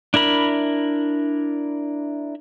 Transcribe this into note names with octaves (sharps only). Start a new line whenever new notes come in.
D4 E4 A#4 B5